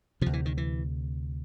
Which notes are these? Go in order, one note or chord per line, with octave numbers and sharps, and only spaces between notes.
D2 C3 F3
E3
D#3
E3